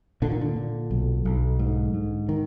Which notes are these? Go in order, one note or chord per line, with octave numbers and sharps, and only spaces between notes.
A#2 D3
D#3
D3
A#2
B1
B1
G#2
G#2
D#3